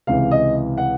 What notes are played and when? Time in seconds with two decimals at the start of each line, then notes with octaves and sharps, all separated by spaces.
0.07 C#2 C3 E3 F5
0.31 D#5
0.78 F#5